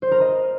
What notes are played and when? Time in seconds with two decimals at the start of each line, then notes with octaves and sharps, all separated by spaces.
0.02 C5
0.12 A#4
0.21 D#5